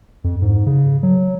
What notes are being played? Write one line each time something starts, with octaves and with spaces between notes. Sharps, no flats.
F2
G#2
C#3
F#3